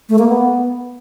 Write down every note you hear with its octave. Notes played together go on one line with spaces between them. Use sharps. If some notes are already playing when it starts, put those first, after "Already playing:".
A3
A#3
B3